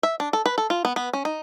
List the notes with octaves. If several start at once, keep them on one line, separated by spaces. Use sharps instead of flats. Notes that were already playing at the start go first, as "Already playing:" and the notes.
E5
D4
A4
B4
A4
F4
B3
B3
C#4
D#4